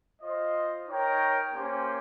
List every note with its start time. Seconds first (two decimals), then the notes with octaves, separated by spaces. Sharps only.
0.22 F4 C5 D#5
0.87 D#4 A#4 C#5 G5
1.53 A#3 C#4 G4 C5 G5